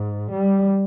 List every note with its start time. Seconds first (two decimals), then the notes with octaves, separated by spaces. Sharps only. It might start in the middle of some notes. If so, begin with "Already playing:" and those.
Already playing: G#2
0.32 G3